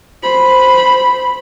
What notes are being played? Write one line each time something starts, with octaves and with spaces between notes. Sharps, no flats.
C5 B5